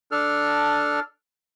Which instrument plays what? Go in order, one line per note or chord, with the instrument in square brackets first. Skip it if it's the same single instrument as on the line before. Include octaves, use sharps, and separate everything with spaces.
[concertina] D4 A4 F6